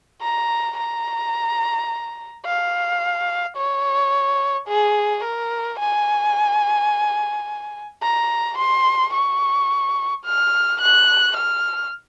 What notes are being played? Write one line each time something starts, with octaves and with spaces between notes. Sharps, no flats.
A#5
A#5
F5
C#5
G#4
A#4
G#5
A#5
C6
C#6
F6
F#6
F6